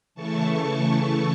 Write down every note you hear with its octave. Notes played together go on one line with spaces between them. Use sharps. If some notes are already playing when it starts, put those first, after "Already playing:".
C#3 E3 A3 A5 C#6